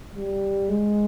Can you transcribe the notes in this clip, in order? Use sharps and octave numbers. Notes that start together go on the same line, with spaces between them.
G3
G#3